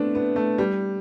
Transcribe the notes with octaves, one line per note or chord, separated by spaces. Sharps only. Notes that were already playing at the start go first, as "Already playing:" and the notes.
Already playing: A3 B3 C4 D4
B3
A3
G3